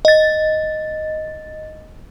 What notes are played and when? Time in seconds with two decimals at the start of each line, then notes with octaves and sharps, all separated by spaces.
0.05 D#5 A6